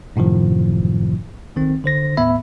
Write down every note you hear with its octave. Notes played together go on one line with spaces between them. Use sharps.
F#2 A2 C3 D#3 F3
B1 D#3 C4
D3 C5 A#6
D#2 A2 B3 E5 B5